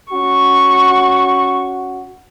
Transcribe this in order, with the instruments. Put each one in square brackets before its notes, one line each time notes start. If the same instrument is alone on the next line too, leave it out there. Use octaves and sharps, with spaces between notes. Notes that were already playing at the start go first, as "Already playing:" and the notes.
[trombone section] C#4 F#4 [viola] C#6